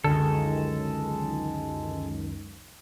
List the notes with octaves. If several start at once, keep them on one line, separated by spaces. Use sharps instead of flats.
C#2 F#2 D3 D#3 G#3 A4